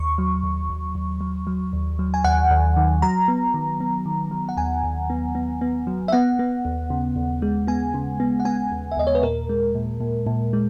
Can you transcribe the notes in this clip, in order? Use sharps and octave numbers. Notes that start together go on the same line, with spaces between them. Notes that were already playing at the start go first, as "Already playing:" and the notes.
Already playing: D#2 C#6
F#3
D#2
D#2
D#2
F#3
F#3
D#2
F#3
G#5
D#2 F#5
D#2
D#3
F#3 A#5
B3
D#3
B3
D#3
F#3
F#5
D#2 G#5
D#2
B3
B3
B3
F#3
E5
B3 F#5
B3
D#2
C#3
D#2
G#3
B3 G#5
C#3
B3
F#5
B3 G#5
D#2
E5
D#2 D#5
C#5
B4
A#2 A#4
G#3
A#2
A#2
A#2
G#3